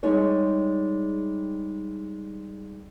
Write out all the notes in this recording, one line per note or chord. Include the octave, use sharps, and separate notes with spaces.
G3 G#3 D#4 G#4 C#5